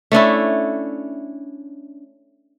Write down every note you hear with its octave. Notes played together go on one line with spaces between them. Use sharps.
A3 C#4 D4 E4